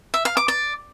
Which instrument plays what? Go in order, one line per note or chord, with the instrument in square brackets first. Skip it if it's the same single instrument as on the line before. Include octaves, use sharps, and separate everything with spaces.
[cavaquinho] E5
F5
D6
D5